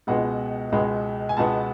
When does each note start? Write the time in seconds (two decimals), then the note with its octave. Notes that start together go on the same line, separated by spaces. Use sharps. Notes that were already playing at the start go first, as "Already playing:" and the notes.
0.07 C#2 B2 G#3 B3 D#5 F#5
0.72 C#2 B2 G#3 B3
1.29 G#5
1.37 C#2 B2 G#3 B3 F#5 A5